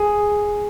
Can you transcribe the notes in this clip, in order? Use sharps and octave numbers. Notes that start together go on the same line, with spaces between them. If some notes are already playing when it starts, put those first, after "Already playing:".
Already playing: G#4